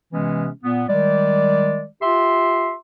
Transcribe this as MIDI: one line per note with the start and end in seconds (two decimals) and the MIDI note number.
0.11 0.49 48
0.11 0.49 52
0.11 0.49 56
0.11 0.49 59
0.11 0.49 61
0.64 0.83 46
0.64 0.83 59
0.88 1.83 51
0.88 1.83 55
0.88 1.83 56
0.88 1.83 74
2.02 2.73 65
2.02 2.73 67
2.02 2.73 76
2.02 2.73 84